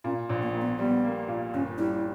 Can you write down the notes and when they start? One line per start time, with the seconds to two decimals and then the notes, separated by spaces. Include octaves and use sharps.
0.04 A#2 C#4
0.30 A#1
0.42 A#3
0.54 A#2
0.61 B3
0.79 G3 B3
1.04 A#3
1.28 A#2
1.53 G1 C#4
1.78 G3 E4